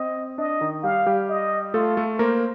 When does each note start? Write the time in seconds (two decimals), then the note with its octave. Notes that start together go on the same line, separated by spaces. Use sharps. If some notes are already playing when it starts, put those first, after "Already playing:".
Already playing: C4 D#5
0.38 D4 D#5
0.61 D#3 D#4
0.83 G3 G4 F5
1.06 G3 G4
1.29 D#5
1.74 A3 F4 A4
1.97 A3 A4
2.19 A#3 A#4 C5